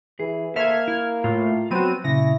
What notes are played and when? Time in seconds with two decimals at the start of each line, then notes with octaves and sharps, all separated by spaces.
0.20 E3 G#4
0.56 A#3 A4 C5 E5 F6 G#6
0.88 E4
1.24 A2 F4
1.71 F#3 B3 C4 F#4 D#7
2.04 A#2 C#3 E4 A#6